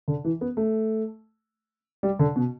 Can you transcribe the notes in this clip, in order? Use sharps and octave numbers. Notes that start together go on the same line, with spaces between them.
D3
E3
B3
A3
G3
D3
B2